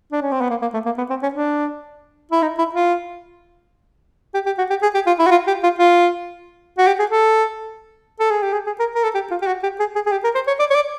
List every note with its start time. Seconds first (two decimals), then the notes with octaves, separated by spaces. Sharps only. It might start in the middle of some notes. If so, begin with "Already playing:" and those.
0.12 D4
0.21 C#4
0.32 C4
0.41 B3
0.50 A#3
0.62 A#3
0.74 A3
0.85 A#3
0.98 B3
1.10 C4
1.23 C#4
1.34 D4
2.32 E4
2.42 D#4
2.58 E4
2.74 F4
4.34 G4
4.46 G4
4.58 F#4
4.70 G4
4.82 G#4
4.94 G4
5.07 F4
5.19 E4
5.26 F#4
5.31 F4
5.47 G4
5.63 F4
5.79 F4
6.78 F#4
6.87 G4
6.99 G#4
7.11 A4
8.20 A4
8.30 G#4
8.42 G4
8.53 G#4
8.67 G#4
8.79 A#4
8.95 A#4
9.04 A4
9.15 G4
9.31 F4
9.42 G4
9.47 F#4
9.63 G4
9.79 G#4
9.95 G#4
10.06 G#4
10.12 G4
10.24 A#4
10.35 C5
10.47 C#5
10.60 D5
10.70 C#5
10.75 D5